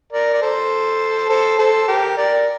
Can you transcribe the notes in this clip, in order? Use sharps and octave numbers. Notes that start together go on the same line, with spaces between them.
A#4 D5
D5
A4 C5
A4 C5
A4 C5
G4 A#4
A#4 D5